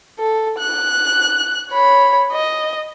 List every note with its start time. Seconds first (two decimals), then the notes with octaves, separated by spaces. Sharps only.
0.19 A4
0.59 F#6
1.70 C#5 B5
2.32 D#5